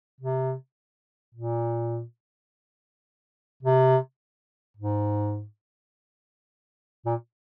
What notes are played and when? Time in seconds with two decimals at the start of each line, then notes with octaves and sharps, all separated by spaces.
0.21 C3
1.35 A#2
3.63 C3
4.77 G#2
7.06 A#2